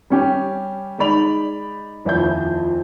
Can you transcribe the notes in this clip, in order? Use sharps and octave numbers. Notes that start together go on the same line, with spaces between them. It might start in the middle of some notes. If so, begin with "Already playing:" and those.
G3 C#4 G4
G#3 D#4 D5 B5 F7
D#1 F2 F3 E4 C5 G6